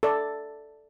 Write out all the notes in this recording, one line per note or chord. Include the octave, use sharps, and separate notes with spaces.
A4 D5